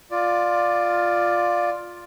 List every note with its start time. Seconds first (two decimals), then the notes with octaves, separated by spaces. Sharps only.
0.11 F4 D5